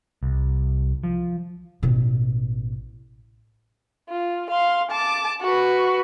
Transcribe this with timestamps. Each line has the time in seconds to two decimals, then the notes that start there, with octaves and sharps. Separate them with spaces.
0.23 C2
1.04 F3
1.83 A1 B2
4.09 F4
4.50 F5 C6
4.91 A5 D6
5.42 F#4 B4